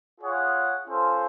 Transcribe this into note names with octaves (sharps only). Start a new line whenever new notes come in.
F4 G#4 C#5 F#5
C#4 F4 A4 C5